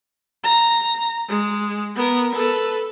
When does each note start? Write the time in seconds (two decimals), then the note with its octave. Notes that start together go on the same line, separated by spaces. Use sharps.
0.44 A#5
1.29 G#3
1.96 B3 A#4
2.35 A4 B4